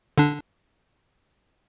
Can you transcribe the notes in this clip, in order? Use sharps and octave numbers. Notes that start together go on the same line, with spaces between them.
D3 D4